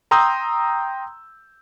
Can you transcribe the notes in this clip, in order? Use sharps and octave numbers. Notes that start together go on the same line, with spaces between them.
G5 A#5 C6 D#6 E6 G6